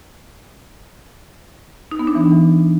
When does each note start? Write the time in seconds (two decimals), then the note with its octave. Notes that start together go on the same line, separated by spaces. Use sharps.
1.91 D#4
1.99 B3
2.07 D4
2.15 E3